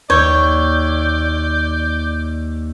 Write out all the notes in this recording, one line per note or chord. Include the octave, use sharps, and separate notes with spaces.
D#2 C#5 D5 G6